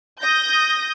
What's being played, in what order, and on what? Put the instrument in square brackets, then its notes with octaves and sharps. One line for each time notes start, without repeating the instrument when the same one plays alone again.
[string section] D#6 G6 A#6